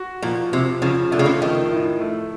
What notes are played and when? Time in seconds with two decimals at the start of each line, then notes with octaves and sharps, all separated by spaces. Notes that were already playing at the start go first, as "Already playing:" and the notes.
Already playing: F#4
0.22 A#2 F3
0.52 C3 F3
0.82 C#3 F3
1.11 D3 A3
1.19 C#3
1.26 D3
1.42 D#3 F3
1.71 A2
2.00 A3